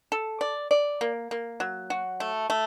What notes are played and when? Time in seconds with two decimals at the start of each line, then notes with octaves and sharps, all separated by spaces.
0.12 A4
0.41 D5
0.71 D5
1.01 A#3
1.31 A#3
1.60 F#3
1.90 F#4
2.20 A3
2.50 A3